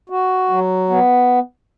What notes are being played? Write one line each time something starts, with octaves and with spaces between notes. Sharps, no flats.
F#4
F#3
B3